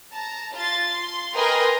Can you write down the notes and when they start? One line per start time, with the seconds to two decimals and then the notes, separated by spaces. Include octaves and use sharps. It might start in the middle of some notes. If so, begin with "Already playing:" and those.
0.11 A5 A#5
0.54 F4 C6 A6
0.84 C6
1.35 A#4 B4 D#5 G5 G#5 C6